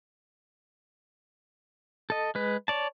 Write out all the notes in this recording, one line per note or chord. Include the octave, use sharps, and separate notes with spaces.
A4 D#5
G#3 B4
C#5 D5 A5